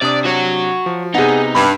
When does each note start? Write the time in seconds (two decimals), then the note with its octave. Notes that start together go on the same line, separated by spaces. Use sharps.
0.02 C3 D4 D5 D#6
0.25 F#4 C#5
0.86 F3
1.15 C3 B3 D#4 G#4 F#5
1.55 G2 B5